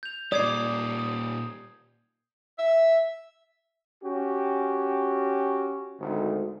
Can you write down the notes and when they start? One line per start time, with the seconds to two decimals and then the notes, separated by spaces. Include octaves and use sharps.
0.03 G6 F7
0.32 A#2 G3 D5 D#6 G#6 C7
0.99 D#6
2.59 E5
4.04 C#4 F#4 G4
6.00 G#1 D2